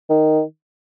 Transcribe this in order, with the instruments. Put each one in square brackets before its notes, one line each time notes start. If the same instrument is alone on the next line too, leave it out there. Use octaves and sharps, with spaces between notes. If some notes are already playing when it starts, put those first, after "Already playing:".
[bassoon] D#3